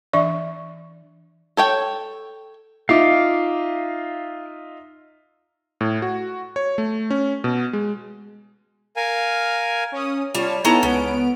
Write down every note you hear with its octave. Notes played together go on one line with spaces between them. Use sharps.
E3 D4 D5 E5 C#6
A4 C#5 G5
D#4 F4 E5 F5 D6
A2
F#4
C#5
A3
C#4
B2
G#3
A#4 F5 G#5
C#4 D#6
G3 F4 C#5 A5 F6
B3 C#4 D#4 E4 A4 A#5
C#2 B3 C#4 D7